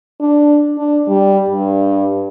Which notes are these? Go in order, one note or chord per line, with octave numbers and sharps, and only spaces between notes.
D4
D4
G3
G2